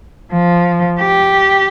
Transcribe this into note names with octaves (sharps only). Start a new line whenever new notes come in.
F3
G4